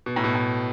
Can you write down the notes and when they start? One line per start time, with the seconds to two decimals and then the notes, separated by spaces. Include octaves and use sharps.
0.06 B2
0.16 A2
0.24 B2
0.35 A2